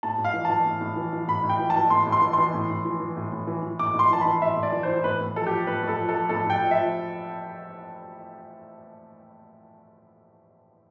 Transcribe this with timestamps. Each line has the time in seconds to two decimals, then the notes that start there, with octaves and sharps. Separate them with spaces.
0.03 A2 A5
0.18 A2
0.24 F5
0.34 E3
0.45 E3 A5
0.66 A2
0.81 A2
0.96 E3
1.13 E3
1.28 A2 B5
1.44 A2
1.49 G5
1.59 E3
1.70 A5
1.76 E3
1.90 A2 C6
2.06 A2
2.12 C6
2.22 E3
2.33 E3 C6
2.54 A2
2.70 A2
2.85 E3
3.00 E3
3.17 A2
3.32 A2
3.47 E3
3.63 E3
3.79 A2 D6
3.95 A2 C6
4.11 E3 A5
4.21 B5
4.26 E3
4.42 A2 E5
4.57 A2
4.63 D5
4.72 E3
4.83 C5
4.88 E3
5.04 A2 B4
5.20 A2
5.36 F3 A4
5.47 G4
5.51 F3
5.67 A2 B4
5.83 A2
5.88 A4
5.99 F3
6.09 A4
6.14 F3
6.29 A2 A4
6.46 A2 G5
6.61 F3
6.71 E5
6.76 F3